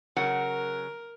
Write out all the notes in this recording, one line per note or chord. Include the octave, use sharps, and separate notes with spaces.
C#3 F#3 A#4 F#5